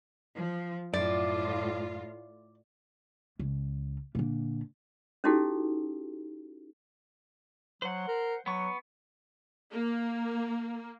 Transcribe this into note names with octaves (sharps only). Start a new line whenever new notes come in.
F3
F#2 A2 F4 D5
C#2
A#2 D3
C#4 D#4 E4 F#4 G4 A4
F#3 C5 F#5
A#4
F#3 B3 C#6
A#3